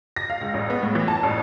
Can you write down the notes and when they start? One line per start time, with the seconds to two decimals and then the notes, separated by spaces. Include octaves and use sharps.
0.16 A#6
0.30 F5
0.41 C#2
0.54 A1
0.70 B3
0.83 A2
0.95 E3
1.08 A5
1.23 A1